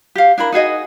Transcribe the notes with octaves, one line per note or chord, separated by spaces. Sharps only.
G4 F5
D4 E4 A#4 B5
D#4 F#4 G#4 D#5